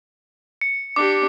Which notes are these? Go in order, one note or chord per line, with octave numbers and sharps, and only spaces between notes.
C#7
D4 G4 D6